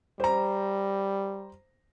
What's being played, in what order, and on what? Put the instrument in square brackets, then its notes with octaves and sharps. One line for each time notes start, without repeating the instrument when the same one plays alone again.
[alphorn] G3 [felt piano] C5 A#5